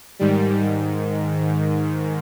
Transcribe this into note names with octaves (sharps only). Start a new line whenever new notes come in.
G#2 D#3 G3